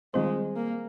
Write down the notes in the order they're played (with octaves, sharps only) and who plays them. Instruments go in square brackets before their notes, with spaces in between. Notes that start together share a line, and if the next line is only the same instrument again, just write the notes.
[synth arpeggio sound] D#3 G3 C4 F4 C5 [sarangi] G#3
[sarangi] A#3